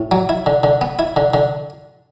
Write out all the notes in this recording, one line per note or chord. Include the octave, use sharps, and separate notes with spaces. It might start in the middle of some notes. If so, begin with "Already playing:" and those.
Already playing: A2
F#3
E4
D3
D3
B3
E4
D3
D3